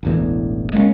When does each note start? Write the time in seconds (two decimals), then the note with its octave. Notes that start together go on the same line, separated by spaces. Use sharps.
0.03 E1 A1 E2
0.73 G#3 A#3 B3 C#4